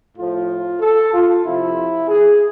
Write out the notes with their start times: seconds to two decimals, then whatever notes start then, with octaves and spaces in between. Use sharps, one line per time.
0.16 A2 F3 F4
0.81 A4
1.13 F4
1.44 F2 C3 F3 E4
2.08 G#4